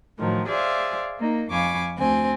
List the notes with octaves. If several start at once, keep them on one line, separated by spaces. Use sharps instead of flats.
A2 D#3 F3 F#3
G#4 C5 D5 E5 F5
A#3 D#4
F2 F5 G#5 B5 C#6 D6
D2 C4 G#5